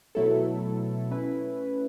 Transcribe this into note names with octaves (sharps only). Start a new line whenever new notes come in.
B2 F#3 A3 E4 A4
A3 C#4 E4 B4